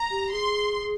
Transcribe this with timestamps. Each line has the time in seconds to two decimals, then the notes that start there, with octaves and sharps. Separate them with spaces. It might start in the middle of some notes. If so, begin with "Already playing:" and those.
Already playing: A#5
0.11 G4
0.32 G#4 C6